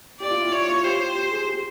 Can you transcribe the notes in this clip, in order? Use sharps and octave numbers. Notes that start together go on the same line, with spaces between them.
G4 D5
F4
E4
C#5
F4
G4 C5
G4
G#4
G4